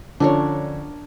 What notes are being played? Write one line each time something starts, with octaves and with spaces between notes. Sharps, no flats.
D3 F3 C#4 D4 A#4 C#5